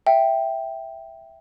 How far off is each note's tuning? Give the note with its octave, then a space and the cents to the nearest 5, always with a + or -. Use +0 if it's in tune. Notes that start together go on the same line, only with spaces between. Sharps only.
E5 +0 G5 +0